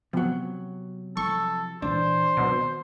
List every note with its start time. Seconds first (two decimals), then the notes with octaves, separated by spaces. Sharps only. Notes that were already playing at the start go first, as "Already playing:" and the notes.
0.13 C3 F3 F#3 B3
1.17 F3 E4 A4 C#6
1.82 A#2 E3 D4 C5
2.37 B2 D#3 F#3 C4